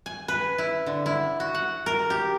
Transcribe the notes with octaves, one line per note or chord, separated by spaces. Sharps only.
G#5
B4
E4
D3
E4
F#4
F#5
A#4
G4